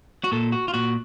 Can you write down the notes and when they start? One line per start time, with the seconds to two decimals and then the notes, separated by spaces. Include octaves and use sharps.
0.24 F#4
0.32 A#2 A4
0.52 F#4
0.68 F4
0.74 A#2 F#4